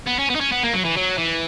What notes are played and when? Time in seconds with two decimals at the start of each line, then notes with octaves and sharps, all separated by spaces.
0.06 B3
0.19 C#4
0.30 B3
0.35 D#4
0.40 C#4
0.52 B3
0.63 A#3
0.73 F#3
0.85 E3
0.97 F#3
1.18 E3